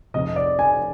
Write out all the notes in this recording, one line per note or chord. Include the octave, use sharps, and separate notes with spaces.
F1 F2 C3 D#5
D5
G#5